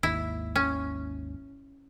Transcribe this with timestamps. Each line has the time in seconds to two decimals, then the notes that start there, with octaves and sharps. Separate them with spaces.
0.03 G#1 D#2 E4
0.56 C#4